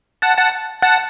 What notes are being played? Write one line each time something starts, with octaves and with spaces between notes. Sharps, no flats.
F#5 A5
F#5 A5
F#5 A5